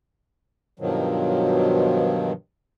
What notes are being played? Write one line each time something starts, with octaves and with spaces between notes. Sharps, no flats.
G2 B2 D#3 F3 F#3